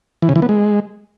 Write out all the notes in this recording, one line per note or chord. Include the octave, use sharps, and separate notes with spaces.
E3
C#3
E3
B3
G#3